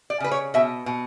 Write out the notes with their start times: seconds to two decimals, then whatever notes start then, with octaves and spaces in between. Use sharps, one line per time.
0.10 D5
0.20 C#3 B4
0.31 C#5
0.54 B2 E5
0.86 B2